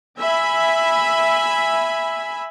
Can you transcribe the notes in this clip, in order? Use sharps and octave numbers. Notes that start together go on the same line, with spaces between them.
E5 G#5 B5